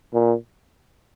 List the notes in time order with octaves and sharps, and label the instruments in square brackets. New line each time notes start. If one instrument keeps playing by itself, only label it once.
[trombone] A#2